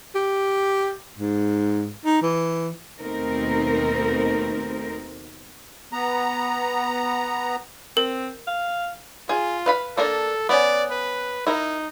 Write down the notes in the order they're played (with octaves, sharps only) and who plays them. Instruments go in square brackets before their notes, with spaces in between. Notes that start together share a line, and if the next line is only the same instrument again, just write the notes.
[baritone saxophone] G4
G#2
D#4
E3
[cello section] D#2 B2 A3 C4 D#4 A#4
[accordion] B3 A#5
[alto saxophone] C4 [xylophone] A#4
[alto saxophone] F5
[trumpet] F4 [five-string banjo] G#4
[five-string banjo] B4 F5 B5
[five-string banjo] A#3 D4 A#4 [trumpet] A4
[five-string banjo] B3 C#4 [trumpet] D5
[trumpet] B4
[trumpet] D#4 [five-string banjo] E4 A#4